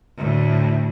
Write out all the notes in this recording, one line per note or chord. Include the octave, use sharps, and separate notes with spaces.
D2 A2